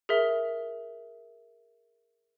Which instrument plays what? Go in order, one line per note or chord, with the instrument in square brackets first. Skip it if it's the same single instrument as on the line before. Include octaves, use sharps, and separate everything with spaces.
[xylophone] G#4 A#4 E5